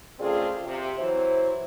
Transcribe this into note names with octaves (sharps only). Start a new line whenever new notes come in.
C#3 A3 C4 F4 G#4 D5
C3
E3 F#3 E4 C5